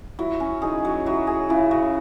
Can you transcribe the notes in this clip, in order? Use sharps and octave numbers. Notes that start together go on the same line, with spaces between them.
F#3 E4
C#4
D#4 G#4
F#3
F#3 E4
G#4
C#3 E4
F#3